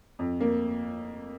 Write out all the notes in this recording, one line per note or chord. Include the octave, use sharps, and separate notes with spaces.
F2
A#3